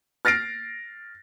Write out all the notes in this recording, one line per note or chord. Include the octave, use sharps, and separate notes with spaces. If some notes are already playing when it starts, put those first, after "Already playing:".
F6 A6 A#6 C7 D7